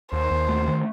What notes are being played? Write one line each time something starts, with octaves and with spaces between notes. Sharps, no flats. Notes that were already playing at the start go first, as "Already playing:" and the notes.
D#2 C5
D#2
A3
D#3